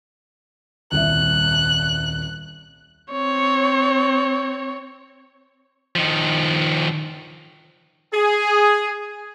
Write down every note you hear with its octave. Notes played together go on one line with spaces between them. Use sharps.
D#1 C2 E5 F#6
C4 C#5
D#3 F3
G#4